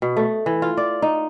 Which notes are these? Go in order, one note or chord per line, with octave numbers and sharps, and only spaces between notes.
B2
A3
E3
F4
D5
D#4